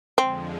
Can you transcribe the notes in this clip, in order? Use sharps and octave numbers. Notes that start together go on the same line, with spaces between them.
F2 D3 F3 G#3 C4